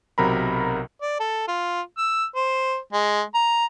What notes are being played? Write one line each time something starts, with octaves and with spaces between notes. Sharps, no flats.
B1 C3 F#3 A#4 A#5 B5
D5
A4
F4
E6
C5
G#3
A#5